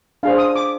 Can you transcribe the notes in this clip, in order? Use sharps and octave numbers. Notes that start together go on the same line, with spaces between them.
D4 G#4 C5 F5
D#6
D6